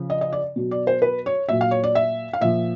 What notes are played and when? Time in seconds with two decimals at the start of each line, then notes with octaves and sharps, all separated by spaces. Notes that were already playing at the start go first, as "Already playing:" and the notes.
Already playing: C#3 F3
0.10 D#5
0.21 D#5
0.33 D5
0.56 B2 F#3
0.71 D5
0.87 C5
1.02 B4
1.26 C#5
1.49 A#2 F#3 E5
1.61 F5
1.71 C#5
1.84 D5
1.95 E5
2.33 F5
2.41 A#2 F3 E5